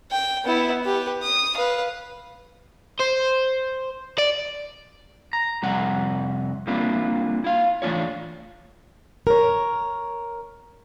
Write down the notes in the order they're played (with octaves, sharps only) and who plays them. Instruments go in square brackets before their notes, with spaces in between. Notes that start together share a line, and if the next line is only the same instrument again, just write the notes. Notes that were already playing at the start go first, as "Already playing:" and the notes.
[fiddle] G5
B3 E4
G4 B4
D#6
B4 F5
[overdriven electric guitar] C5
D5
[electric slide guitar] A#5
F2 C3 G3 F#5 A#5
G3 A#3 C4 D4 E4 F4
E4 F5
E3 A3 D4 F4 C#5
[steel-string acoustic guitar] A#4 C#5